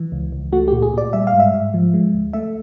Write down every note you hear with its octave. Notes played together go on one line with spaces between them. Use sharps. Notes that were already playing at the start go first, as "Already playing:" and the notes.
Already playing: E3
C#2
C#2
A3 F#4
G4
A#2
G#4
A#2 D5
G3 E5
F5
G#2
E5
G#2
F3
G#3
D2
A3 E5